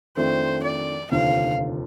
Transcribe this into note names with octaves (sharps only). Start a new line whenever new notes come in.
F2 D#3 A3 D4 F4 C5
D5
F1 D#2 D3 F3 F5